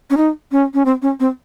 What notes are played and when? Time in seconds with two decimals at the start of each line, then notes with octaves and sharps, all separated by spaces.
0.10 C#4
0.17 D#4
0.52 C#4
0.74 C#4
0.85 C4
1.02 C#4
1.20 C4